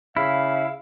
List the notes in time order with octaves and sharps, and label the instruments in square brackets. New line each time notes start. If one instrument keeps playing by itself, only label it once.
[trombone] C#3 [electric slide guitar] E4 [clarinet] F5